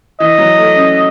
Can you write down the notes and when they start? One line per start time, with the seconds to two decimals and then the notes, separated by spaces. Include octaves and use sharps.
0.20 E3 D#5
0.38 F#3
0.58 A3
0.75 C#4